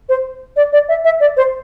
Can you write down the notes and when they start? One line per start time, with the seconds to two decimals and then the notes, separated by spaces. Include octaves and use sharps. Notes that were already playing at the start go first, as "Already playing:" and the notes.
0.09 C5
0.56 D5
0.73 D5
0.89 E5
1.04 E5
1.20 D5
1.37 C5